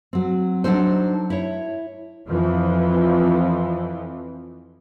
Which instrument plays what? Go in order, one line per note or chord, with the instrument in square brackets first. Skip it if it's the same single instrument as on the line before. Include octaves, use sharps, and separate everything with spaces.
[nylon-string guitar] F#3 C4
F#3 D4 D#4 A4 C5
E4 C#5
[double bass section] F2 E3 F3